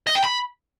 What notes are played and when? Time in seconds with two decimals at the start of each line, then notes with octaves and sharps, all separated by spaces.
0.07 D#5
0.15 G5
0.24 B5